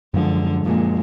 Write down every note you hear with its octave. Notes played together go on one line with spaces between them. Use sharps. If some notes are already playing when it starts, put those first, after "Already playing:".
F#2 D3 F3 G#3
F#2 A#2 F3 G#3